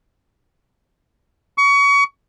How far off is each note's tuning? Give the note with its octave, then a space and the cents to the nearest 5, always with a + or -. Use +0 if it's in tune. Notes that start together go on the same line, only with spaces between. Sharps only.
C#6 +30